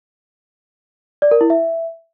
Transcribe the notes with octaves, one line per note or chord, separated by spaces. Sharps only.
D5
A#4
E4
E5